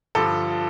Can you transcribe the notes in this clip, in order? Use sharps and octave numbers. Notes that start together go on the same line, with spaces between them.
G2 D3 F3 A4